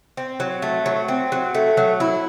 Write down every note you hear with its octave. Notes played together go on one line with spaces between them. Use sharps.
C4
F#3
A3
F#3
C4
F#3
A3
F#3
E4